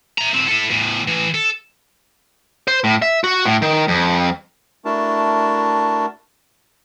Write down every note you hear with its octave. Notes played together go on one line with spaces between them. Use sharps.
E5 A#5
A2 C4
E4 A4
E2 A2
A2 E3
A4
C5
A2
E5
F#4
A2
D#3
F2
A3 D4 E4 F#4 A#4 A5